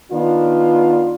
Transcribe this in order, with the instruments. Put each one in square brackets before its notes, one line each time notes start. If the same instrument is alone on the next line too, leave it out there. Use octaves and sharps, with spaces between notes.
[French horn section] D#3 B3 D4 F4